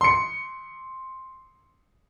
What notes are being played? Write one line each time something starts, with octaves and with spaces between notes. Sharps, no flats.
C6 C#7